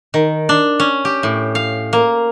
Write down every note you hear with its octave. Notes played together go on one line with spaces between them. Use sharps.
D#3
D4
C#4
G4
A2
F5
A#3